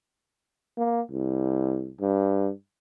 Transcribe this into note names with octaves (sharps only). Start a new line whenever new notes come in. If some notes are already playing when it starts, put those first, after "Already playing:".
A#3
C2
G2